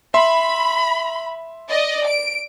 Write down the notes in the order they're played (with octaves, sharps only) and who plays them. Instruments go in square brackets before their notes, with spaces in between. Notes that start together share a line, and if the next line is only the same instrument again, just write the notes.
[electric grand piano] E5 C6 [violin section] B5
[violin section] D5 D#5
D7